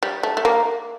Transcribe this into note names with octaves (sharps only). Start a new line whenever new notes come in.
G3
A3
A3
A#3